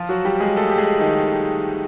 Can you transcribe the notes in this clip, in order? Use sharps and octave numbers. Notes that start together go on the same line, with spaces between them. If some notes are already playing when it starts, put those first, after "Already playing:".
Already playing: F3 F4
F#3 F#4
G3 G4
G#3 G#4
A3 A4
G4
G#3 G#4
D#3 D#4